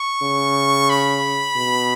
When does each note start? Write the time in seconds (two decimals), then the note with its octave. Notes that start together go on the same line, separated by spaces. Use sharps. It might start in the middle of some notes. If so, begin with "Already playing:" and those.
Already playing: C#6
0.22 C#3
0.90 B5
1.57 B2